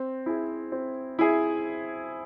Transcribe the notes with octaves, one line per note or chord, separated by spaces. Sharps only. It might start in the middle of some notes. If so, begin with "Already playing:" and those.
Already playing: C4
E4 G#4
C4
E4 G#4